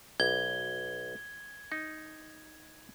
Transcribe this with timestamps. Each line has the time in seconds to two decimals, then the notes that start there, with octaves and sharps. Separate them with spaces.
0.20 B1 G#6 G7
1.72 D#4